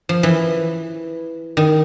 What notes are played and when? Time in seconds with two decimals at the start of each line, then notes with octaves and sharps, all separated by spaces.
0.09 F3
0.23 E3
1.57 D#3